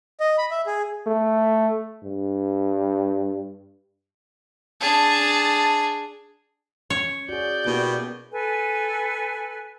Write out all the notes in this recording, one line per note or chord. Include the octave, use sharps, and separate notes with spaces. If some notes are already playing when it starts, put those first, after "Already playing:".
D#5
B5
E5
G#4
A3
G2
D4 G#4 A5
C#4 C#5
F#4 G#4 D5 G6
B2 A#3 E4 G4
A4 B4 G#5